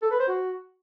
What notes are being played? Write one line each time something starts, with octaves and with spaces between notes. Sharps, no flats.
A4
B4
C5
F#4